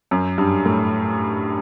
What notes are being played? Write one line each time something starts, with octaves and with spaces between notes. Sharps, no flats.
F#2
G2
A2